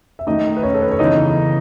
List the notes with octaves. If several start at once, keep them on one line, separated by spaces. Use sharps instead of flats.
E5
D#3 A3 D#4 D#5
B4
C#4 C#5
A4
B4
C#5
C#3 E3 B3 D#4 D#5